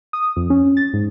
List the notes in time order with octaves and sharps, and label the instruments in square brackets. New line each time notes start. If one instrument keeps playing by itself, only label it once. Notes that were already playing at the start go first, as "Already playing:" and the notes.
[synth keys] D#6
F2
C#4
A6
G#2